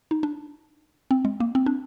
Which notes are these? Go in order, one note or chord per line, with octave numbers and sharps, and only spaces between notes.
D#4
D4
C4
G#3
A#3
C4
D4